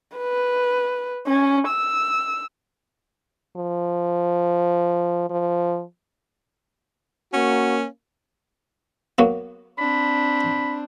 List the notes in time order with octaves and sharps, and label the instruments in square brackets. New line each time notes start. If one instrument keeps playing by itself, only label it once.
[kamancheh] B4
C#4
E6
[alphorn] F3
F3
[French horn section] A#3 [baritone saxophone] C#4 [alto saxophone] F#4
[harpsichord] F#3 A#3 B3
[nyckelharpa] C4 D4 [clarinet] B5